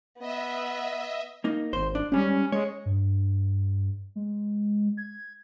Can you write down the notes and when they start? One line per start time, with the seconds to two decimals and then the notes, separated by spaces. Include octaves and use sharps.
0.19 B3 D#5 E5
1.44 A#3 D#4
1.73 G#1 C5
1.95 D4
2.12 G#2 G3 C#4
2.52 G#3 C#5
2.86 G2
4.16 G#3
4.97 G#6